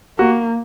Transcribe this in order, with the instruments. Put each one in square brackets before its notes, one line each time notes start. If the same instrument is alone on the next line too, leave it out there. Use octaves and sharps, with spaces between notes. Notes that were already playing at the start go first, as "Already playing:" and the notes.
[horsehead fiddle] A#3 [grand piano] F#4